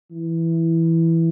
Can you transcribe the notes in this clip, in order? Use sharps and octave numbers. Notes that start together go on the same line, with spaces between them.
E3